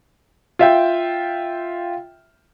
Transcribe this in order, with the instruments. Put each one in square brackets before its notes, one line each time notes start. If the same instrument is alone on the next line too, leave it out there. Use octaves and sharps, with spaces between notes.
[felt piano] F4 E5 G5